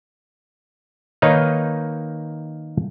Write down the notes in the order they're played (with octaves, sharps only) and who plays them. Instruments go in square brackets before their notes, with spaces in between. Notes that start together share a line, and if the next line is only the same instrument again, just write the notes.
[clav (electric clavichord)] D#3 A#3 D#4 B4 C#5